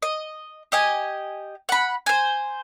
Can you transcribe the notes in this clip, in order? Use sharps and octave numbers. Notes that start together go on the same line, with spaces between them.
D#5
G4 D#5 G#5
F#5 B5
C5 G#5